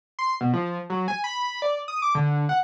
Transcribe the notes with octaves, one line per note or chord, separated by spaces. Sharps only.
C6
B2
F3
F#3
G#5
B5
D5
D#6
D6
D3
F#5